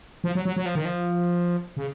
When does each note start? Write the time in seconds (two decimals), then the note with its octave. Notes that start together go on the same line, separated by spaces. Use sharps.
0.24 F3
0.35 F#3
0.45 F#3
0.56 F#3
0.66 F3
0.75 D#3
0.85 F3
1.77 C#3